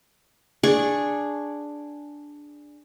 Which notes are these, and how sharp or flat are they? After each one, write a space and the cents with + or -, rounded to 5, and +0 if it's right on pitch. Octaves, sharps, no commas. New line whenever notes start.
D4 +0 G#4 -5 C#6 -10